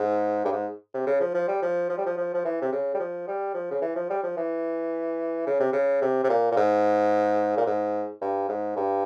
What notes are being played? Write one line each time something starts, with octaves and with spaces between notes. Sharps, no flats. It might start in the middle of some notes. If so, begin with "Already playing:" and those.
Already playing: G#2
G2
G#2
C3
C#3
F3
F3
G3
F3
F3
G3
F3
F3
F3
E3
C3
C#3
G3
F3
G3
F3
C#3
E3
F3
G3
F3
E3
C#3
C3
C#3
C3
C3
A#2
A#2
G#2
A#2
G#2
G2
G#2
G2